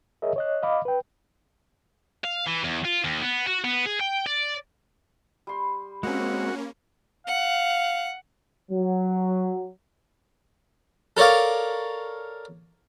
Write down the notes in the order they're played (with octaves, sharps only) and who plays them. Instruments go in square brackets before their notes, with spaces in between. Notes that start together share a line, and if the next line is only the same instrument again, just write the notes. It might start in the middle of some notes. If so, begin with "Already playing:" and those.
[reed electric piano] G#4 A#4 C#5 D#5 E5
C#5 D#5 F#6
D#5 F5 B5 D6
B4 G5
[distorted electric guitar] F5
E3
E2
F4
D#2
B3
F#4
B3
G#4
G5
D5
[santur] G3 C6
[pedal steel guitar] G#3 C4 [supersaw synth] A#3 C#4 [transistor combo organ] F#4
[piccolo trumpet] F5 [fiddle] F#5
[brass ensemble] F#3
[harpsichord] A4 A#4 C#5 D5 F5